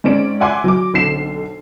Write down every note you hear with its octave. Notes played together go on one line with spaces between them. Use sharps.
G#2 C4 C#4 D5 D7
D5 E5 F#5 G#5 C6 D6
F#3 D6
B1 D3 C4 C7 E7